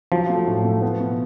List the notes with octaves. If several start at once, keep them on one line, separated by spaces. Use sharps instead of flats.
F3 F#3
A3
A2
A3
B3
B2